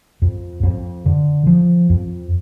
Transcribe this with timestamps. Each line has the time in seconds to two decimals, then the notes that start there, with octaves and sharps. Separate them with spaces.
0.22 F2
0.63 F2
1.05 D3
1.47 F3
1.90 F2